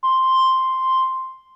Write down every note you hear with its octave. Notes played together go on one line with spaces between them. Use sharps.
C6